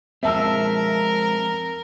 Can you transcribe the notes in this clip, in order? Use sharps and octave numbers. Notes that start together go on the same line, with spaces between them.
F3 G#3 C4 A#4 E5 A5 E6